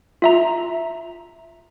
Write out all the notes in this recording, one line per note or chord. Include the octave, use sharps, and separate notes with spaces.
F4 E5 A#5